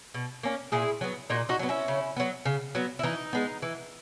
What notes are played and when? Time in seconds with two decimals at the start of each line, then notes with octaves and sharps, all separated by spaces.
0.14 B2
0.43 A#3 C#4
0.72 A#2 E4 G#4
1.01 F#3 B3
1.30 A#2 D#4 F#4
1.49 D#4 F#4
1.59 F#3 B3
1.69 C#4 E4
1.88 C#3
2.16 F#3 B3
2.45 C#3
2.75 F#3 B3
2.99 E4
3.03 E3 D#4
3.33 G#3 B3
3.62 E3